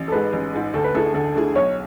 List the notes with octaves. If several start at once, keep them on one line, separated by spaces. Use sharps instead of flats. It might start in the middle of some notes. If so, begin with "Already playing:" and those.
Already playing: A1
A4
G#2 G#3 B4
A1
G#2 G#3
D2 A4
B4
D3 A3 E4 G#4 A4
D2 A4
D3 A3 E4 G#4
B1 C#5